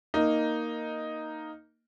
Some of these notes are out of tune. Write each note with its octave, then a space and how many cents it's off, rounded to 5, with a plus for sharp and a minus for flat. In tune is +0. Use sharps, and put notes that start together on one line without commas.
A#3 +0 D#4 +0